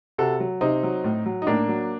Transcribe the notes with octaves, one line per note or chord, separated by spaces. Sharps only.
C3 F#4 A4
F#3
C3 C4 D#4
F#3
A2
F#3
D#4
A2 A#3 D4
F#3